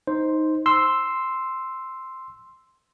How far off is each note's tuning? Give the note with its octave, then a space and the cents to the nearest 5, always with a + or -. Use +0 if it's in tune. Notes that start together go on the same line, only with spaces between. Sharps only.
D#4 +5 C5 +0
C6 +0 E6 +0